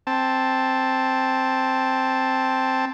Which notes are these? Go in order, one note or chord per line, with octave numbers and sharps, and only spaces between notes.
C4 A5